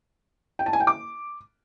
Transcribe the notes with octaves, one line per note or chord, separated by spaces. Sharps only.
G5
A5
G#5
G5
D6